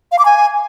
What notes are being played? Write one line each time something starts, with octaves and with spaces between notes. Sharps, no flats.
F5
D6
G#5